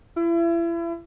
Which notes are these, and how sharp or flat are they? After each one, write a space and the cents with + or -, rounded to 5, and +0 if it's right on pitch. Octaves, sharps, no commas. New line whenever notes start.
E4 +35